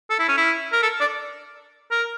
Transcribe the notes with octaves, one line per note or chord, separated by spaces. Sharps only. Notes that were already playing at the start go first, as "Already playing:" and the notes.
A4
E4
C#4
E4
A#4
A4
D5
A#4